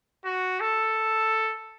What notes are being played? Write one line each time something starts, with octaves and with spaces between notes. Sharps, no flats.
F#4
A4